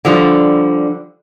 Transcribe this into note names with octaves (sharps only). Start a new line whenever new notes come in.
D3 F3 G3